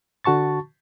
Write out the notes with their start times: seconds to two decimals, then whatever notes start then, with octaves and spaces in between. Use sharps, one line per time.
0.24 D3 F#4 A5 C#6 A6